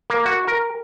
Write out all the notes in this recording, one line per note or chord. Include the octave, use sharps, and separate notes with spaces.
A#3
F#4
A#4